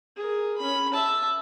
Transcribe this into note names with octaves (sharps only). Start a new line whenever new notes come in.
G#4 A#4
C#4 B5
E5 A5